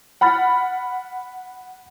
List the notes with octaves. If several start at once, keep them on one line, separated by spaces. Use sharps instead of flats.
F#5 B5 F6 A6